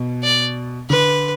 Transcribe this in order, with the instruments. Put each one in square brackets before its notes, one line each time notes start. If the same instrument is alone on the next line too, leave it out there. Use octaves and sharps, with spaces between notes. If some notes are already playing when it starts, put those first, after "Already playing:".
Already playing: [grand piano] B2
[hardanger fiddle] D5
[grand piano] D3 [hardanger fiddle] B4